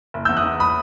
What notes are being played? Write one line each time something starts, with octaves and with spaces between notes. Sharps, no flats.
F#1
E2 E6 G6
D#6 F#6
E2
B5 D#6